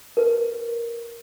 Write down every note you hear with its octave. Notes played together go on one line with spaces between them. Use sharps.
A#4 B4